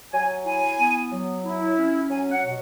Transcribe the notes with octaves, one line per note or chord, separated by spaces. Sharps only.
F#3 G#5
E4 G#5
B3
F#3
E4
C#4
F#3 G#5
F#5
B2